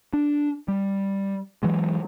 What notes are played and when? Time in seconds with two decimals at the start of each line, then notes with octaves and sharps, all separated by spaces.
0.13 D4
0.68 G3
1.63 E3 F#3 G#3